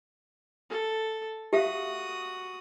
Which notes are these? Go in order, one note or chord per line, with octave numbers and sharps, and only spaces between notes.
A4
F#4 G4 E5 F5 D#6